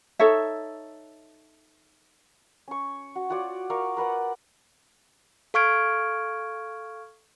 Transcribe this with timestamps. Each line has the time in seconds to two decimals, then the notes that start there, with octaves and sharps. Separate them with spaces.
0.19 D#4 A4 C#5 E5
2.68 C#4 C#6
3.16 F#4
3.30 F4 F#4 C#5 D5
3.70 A#4 D5 F5 C#6
3.97 A#4 B4 D5 F#5
5.54 A4 F5 C#6 F6 G#6 D7